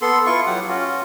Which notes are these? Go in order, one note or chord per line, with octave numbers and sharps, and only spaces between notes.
B3 A4 C6
E4 F4 C#6
F#3 G4 F#5
C#4 F4 F#4